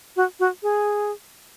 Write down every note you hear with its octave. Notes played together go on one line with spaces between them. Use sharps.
F#4
F#4
G#4